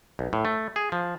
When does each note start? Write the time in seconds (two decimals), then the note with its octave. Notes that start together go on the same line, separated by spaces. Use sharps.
0.19 B1
0.33 A2
0.45 A3
0.76 G#4
0.92 F3